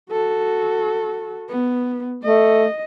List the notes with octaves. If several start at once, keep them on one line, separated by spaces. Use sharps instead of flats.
F#4 A4
B3
A3 D#5